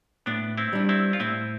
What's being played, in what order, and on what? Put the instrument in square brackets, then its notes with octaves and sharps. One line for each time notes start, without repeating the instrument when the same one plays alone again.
[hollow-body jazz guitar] A2 [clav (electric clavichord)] B3 D4
[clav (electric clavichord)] C4 E4
[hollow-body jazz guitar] G3 D4
[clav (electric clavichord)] C4 E4
F4
[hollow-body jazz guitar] A2 [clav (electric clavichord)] C4 E4